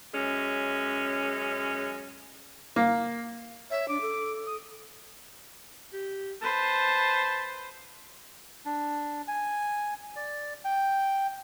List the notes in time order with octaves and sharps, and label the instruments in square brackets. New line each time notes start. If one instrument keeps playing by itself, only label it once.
[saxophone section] F#2 G#3 C#4
[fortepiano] A#3
[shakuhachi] C#5 [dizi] E5
[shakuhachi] D4 [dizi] D6
[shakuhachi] A4
[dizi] D#6
[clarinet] G4
[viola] B4 C5 [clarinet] A5
[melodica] D4
G#5
D5
G5